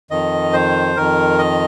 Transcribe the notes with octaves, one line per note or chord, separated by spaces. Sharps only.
F2 D#3 D#5
C5
F2 D#3 A#4
D#5